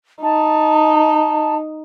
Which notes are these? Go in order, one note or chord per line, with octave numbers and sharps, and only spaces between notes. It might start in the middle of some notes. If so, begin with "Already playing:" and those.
D#4 A5